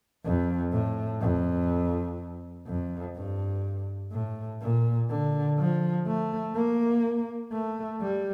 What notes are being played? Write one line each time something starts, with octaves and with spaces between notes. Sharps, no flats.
F2
A2
F2
F2
G2
A2
A#2
D3
F3
A3
A#3
A3
G3